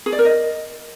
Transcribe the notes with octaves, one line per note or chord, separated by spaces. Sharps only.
G#4
D5
A#4
D#5